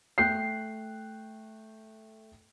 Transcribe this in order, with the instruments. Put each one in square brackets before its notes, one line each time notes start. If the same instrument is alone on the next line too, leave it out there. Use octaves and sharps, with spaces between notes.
[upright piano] A3 G5 F#6 G6 C7